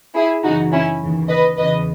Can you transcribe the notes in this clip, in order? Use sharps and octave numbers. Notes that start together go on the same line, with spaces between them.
E4 G#4
F#2 C#3 E3 D#4 F#4
C#4 E4
D#2 C#3 E3
B4 D#5
E2 C#3 E3 B4 D#5